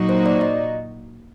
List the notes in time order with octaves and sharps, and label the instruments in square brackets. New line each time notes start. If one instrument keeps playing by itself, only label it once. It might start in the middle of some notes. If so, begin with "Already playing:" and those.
Already playing: [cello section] A#2 F#3 A#3 D#4 F#4
[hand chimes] C5
D5
D#5